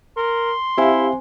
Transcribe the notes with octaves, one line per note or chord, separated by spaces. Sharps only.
A#4 C6
C4 E4 G4 C5 E5 F5 G#5